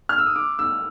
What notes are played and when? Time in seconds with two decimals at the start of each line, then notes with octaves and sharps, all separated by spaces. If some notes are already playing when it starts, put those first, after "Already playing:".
0.09 F6
0.18 E6
0.27 D#6
0.36 D6
0.59 E6